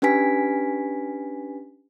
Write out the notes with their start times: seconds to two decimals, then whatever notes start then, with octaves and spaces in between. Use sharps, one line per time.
0.02 C#4 D4 G4 B4 G#5 B6